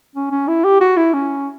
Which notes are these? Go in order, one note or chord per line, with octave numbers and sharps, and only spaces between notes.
C#4
C#4
E4
G4
F#4
E4
C#4